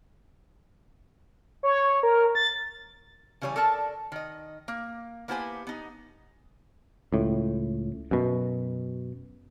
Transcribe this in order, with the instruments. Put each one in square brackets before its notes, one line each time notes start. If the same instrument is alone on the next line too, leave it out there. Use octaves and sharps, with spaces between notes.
[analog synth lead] C#5
A#4
A6
[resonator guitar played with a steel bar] C#3 E3 G3 C#5 G#5
A4 A#4 D5 A5
D#3 D#5
A#3
A#3 B3 E4 G4 C5 G#5
B3 D#4
[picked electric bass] C#2 A2
F#2 B2